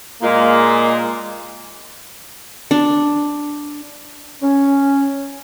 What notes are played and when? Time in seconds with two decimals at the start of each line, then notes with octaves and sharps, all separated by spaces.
0.22 A#2 G#3 A#3
2.71 D4
4.42 C#4